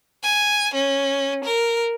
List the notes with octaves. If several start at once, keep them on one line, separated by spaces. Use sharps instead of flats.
G#5
C#4
A#4